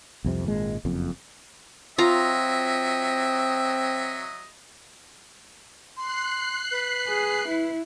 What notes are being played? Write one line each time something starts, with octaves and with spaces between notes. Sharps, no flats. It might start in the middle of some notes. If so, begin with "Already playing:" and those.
C2 F2 C3
G#1 A#2 G#3
F#1 F2
F#3 C4 F4 D#5 E5 A#5
C6 F#6 C7
B4
G#4
E4